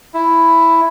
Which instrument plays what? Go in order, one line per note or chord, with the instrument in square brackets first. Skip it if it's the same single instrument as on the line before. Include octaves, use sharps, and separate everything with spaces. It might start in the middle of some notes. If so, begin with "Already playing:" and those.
[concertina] E4